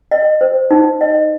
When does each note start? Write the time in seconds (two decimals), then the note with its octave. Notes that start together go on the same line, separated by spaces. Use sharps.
0.11 D#5
0.41 C5
0.71 D#4
1.01 D#5